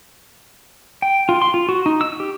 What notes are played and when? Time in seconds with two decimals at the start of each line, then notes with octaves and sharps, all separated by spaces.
1.02 G5
1.29 F4
1.42 C6
1.54 F4
1.69 F#4
1.86 D#4
2.01 E6
2.20 G4